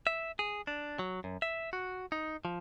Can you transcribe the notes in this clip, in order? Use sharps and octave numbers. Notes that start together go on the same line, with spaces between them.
E5
G#4
D4
F#3
F#2
E5
F#4
D#4
F3